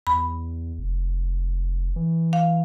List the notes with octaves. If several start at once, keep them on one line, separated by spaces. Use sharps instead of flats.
E2 B5
F1
E3
F5